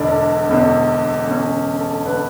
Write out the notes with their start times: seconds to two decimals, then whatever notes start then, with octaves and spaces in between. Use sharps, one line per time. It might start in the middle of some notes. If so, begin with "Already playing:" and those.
Already playing: E1 E2 D3 D4
0.49 E1 E2 D3
1.27 E1 E2 D3 C#4
1.79 A4
2.05 D3 B4